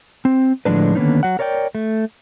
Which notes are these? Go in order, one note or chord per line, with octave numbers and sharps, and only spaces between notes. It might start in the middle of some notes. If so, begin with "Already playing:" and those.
C4
A2 D3 F3 G#3 D4 B4
D3 D#3 A#3 B3 C#4 D#4
F#3 F#5
A#4 C#5 D5 F5 G5
A3